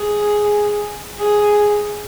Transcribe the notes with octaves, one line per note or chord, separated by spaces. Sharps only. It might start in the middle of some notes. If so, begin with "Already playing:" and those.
Already playing: G#4
G#4